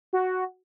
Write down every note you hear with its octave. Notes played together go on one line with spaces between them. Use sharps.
F#4